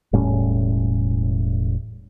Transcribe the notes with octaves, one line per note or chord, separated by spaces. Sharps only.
E1 A2 G3 C#4